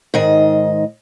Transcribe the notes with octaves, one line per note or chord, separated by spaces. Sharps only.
G#2 D#3 D#5